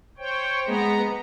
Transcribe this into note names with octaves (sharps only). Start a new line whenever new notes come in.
C5 C#5 G5
G#3 B3 A#5